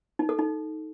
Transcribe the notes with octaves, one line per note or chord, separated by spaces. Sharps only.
D#4
A4
D#4